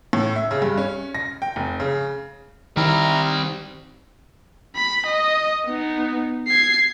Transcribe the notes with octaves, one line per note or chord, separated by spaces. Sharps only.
A2
E5
C#3
G2
C#4
A#6
G5
F1
C#3
D#3 G3 C4 E4 A#5 F6
B5
D#5
B3 D#4
G#6 C7